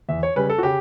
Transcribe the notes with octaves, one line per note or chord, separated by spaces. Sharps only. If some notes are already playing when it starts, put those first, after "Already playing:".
E2 E5
C#5
C#3 G3 C#4 B4
A4
F#4
C#3 G4